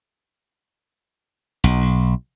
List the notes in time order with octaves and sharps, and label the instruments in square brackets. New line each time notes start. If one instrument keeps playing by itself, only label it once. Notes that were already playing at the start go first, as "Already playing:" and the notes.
[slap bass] B1